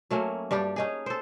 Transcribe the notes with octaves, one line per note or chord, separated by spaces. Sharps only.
F#3 A3 A#3 C#4
G2 G3 D4 G4
C#4 D#4 G#4
A4 C5